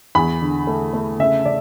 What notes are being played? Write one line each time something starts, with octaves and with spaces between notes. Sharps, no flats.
E2 B5
D3
A3
A3
C#3 E5
C#3 D5